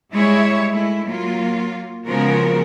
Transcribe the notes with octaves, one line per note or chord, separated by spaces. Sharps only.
G3 G#3 E4 C#5 E5
G#3 A3 E4
F#3 A#3 F4
C#3 F3 G#3 B3 F#4 A#4